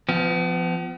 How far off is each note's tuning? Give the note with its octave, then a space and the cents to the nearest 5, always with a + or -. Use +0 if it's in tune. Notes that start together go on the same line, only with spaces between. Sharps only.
F3 -5 B3 +40